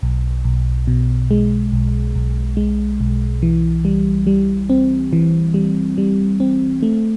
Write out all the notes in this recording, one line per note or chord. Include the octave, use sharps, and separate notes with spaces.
B1
B1
B2
G#3
B1
B1
G#3
B1
E3
G3
G3
C4
E3
G3
G3
C4
A3